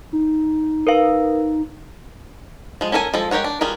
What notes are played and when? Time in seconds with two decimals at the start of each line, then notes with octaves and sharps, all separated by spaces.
0.13 D#4
0.87 A#4 B4 F5
2.81 F3 G#3
2.92 C#4 A4 A#4 C#5 G#5
3.14 F3 G#3 A4
3.31 G#3 G4 A#4 C#5 F#5
3.44 D4
3.61 G3 F4 G#4 A#4 B4